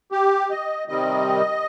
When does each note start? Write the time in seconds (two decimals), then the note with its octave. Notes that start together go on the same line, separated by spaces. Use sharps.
0.12 G4
0.51 D#5
0.88 C3 D#3 G3 C4 D#5